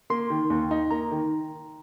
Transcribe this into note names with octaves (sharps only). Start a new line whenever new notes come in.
A#3 C6
D#3
D#2
D#4
A#3 A#5
D#3